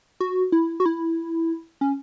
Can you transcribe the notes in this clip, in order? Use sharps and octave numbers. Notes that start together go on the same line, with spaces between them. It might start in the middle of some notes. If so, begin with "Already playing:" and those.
F#4
E4
F#4
E4
C#4